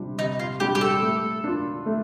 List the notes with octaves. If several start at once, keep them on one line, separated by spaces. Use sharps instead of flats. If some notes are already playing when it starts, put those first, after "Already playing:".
Already playing: C3 G3 D4 F4
C3 D#4
F4
G3 D4 F4 G4
G4
A4
A3
D4 F4
A3